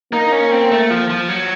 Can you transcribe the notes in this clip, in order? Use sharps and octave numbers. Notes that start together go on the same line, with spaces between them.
A#3 D#4
C#4
C4
A3
F3
F3
F#3